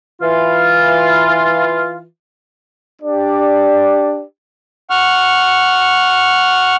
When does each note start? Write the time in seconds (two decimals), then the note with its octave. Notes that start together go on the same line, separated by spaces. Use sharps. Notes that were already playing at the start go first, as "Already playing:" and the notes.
0.22 E3 F4
3.02 D4 G4 D5
4.90 F#5 C#6 F6